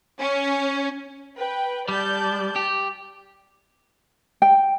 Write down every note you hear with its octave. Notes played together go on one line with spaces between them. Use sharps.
C#4
B4 G5
G3 D5 A5 G6
G4
G5